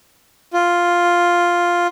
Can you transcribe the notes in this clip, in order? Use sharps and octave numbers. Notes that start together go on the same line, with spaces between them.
F4